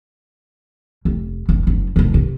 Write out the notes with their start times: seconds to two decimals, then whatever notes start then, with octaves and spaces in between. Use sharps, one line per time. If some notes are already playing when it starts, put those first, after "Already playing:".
1.05 F1
1.49 F#1
1.67 F#1
1.96 F1 D#3
2.14 C3